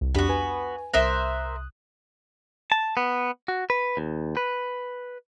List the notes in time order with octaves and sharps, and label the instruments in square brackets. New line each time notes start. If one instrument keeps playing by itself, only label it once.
[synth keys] C2
[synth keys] F2 D4 G4 [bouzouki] B3 F#4
[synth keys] B4 G#5
[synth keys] C2 D#6 F#6 [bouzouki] A#4 C5 E5
[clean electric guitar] A5
B3
F#4
B4
D#2
B4